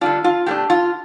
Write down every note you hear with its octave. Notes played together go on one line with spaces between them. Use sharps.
D3 G3 D4 F4
F4
B2 A3 D4 G4
F4